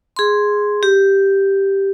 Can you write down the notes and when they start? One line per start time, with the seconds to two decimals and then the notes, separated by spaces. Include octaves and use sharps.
0.16 G#4 C6
0.83 G4